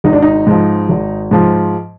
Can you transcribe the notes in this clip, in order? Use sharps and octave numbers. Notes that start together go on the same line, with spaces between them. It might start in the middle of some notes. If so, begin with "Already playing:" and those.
G#1 D#4
D4
D#4
G#2 F3
G#1
G#2 F3